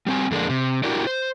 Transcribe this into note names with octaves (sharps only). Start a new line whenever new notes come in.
G3 C4 G#5
F2 D3 G#3 A#3 D4
C3
D4 E4 F#4 G4 A#4 D5
C5